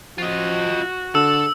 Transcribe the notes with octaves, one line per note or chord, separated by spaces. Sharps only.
F3 F4 F#4 D#5
D3 A4 E6